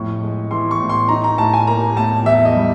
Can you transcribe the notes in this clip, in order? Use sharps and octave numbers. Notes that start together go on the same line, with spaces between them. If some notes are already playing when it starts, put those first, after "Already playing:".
Already playing: F2 A2 C#6
G#3
E3 C6
C#6
A2
C6
D#4 A#5
A#5
A2 A5
G#5
A#3 A#5
A2 A5
E2 E5
D#5
G3